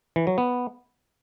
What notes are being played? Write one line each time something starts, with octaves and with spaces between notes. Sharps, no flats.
E3
F#3
B3